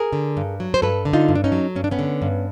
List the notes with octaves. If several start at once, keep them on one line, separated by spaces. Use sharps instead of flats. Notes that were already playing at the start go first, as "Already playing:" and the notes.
Already playing: G#4 A#4
D3
G2
F#3
C5
G2 A4 B4
D3
D#4 F4
G2
D4
C#4 D#4
F#3
G2 C#4
D4
B3 C#4
D3
G2